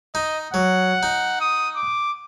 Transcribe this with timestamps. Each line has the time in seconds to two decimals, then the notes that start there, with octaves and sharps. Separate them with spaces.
0.15 D#4 D#5
0.54 F#3 F#5
1.03 D#4
1.41 D#6
1.76 D6